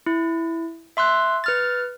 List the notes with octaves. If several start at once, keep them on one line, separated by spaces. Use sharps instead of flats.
E4
E5 C6 E6 F#6
B4 F6 A6